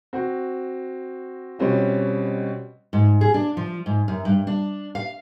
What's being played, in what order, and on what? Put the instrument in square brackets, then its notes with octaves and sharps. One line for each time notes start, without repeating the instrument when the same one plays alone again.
[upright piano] C4 F#4
B2 G3 C4 C#4 F4
[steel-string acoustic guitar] G#2
G#4
D4
F3
G#2
F#2
G2
D4
F5